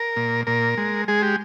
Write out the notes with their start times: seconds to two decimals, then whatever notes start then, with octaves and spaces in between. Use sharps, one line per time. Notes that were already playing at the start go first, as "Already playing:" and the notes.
Already playing: A#4
0.16 A#2
0.47 A#2 A#4
0.77 G#3
1.08 G#3 G#4
1.22 G4